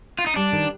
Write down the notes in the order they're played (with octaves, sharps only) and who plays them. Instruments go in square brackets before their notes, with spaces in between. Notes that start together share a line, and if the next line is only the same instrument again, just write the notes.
[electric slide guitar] F4
D#4
[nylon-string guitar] G3 [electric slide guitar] D4
[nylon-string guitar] D#3